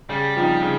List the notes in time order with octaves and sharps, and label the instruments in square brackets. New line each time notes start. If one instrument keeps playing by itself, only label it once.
[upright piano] C#3 [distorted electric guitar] G3
[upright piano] F3 C4 D#4
C#3